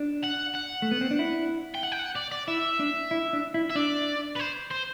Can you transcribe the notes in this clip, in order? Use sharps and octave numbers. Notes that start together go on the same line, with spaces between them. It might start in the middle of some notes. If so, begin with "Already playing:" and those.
Already playing: D4
F#5
F#5
A3
B3
C4
D4
E4
G5
F#5
G5
F#5
D5
D5
E4 E5
D4
E4
D4
E4
E5
D4 D5
B4
C5
C5